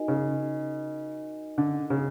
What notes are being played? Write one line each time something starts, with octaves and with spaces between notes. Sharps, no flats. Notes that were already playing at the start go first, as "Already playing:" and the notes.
Already playing: D#4 F#4 A#4 D#5 G#5
C#3
D3
C#3